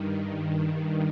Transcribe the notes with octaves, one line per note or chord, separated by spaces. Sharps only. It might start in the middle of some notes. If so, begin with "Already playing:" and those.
Already playing: G2 D#3